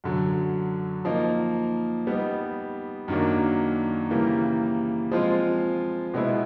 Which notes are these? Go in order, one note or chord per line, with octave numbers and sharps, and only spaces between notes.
F#2 D3 F#3
F3 A#3 D#4
G3 B3 D#4
F#2 D#3 F#3 A#3 D4
C#3 E3 G3 A#3
F3 G#3 C4 F4
B2 G#3 B3 E4